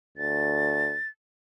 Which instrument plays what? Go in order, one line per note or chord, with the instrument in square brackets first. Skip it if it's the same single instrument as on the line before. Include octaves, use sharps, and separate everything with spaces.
[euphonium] D2 [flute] A6